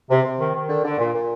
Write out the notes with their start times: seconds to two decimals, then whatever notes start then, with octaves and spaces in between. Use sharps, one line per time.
0.10 C3
0.24 C3
0.39 D#3
0.53 D#3
0.69 D3
0.84 D3
0.98 A#2
1.14 A#2